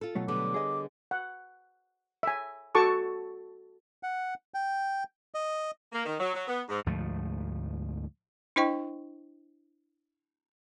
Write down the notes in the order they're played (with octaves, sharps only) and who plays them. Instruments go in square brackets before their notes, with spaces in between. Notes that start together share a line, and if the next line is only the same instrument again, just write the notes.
[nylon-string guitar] F4 A4
[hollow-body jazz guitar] B2 F#3 A3
[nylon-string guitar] D3 G3 B3 [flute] D6
[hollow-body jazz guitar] G#4 C#5 D#5
[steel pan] F#5
E5 G#5
F#4 A4 A5 C#6 D6
[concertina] F#5
G5
D#5
[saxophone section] A#3
D#3
F#3
F#3
B3
G#2
[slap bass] D2 G#2 F3 A3
[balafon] D4 E4 C5 D#5 G5 C#6